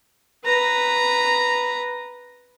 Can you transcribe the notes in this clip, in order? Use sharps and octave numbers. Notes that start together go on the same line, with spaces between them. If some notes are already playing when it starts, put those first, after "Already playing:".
B4 A#5